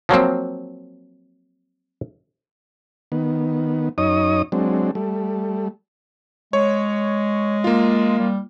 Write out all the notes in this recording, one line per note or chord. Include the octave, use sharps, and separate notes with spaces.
F3 F#3 A#3 C4
D#3 B3
F#2 D#4 C#5 D#5 D#6
F#3 G#3 C4 D4
G3 A3
G#3 C#5
A#3 F4
G3